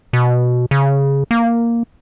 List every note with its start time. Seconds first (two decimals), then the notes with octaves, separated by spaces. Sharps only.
0.13 B2
0.71 C#3
1.31 A#3